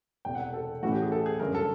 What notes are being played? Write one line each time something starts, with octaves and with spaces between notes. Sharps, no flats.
E1 E2 C3 G5
F#5
A4
A2 E3 A3 C#4 E4 F#4
G4
G#4
A4
G#4
G1 F#2 C#3 A#4
A4